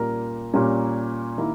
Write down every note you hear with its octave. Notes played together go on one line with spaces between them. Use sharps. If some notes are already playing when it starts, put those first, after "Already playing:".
Already playing: A#2 G3 A#3 C#4 A#4
A#2 G3 A#3 C#4
D#3 A#3 E4